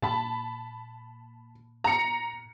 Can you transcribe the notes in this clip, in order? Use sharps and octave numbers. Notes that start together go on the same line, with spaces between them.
A#2 A5 B5
A#5 C#7